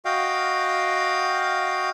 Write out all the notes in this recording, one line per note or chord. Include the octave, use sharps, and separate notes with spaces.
F#4 D#5 F5 G5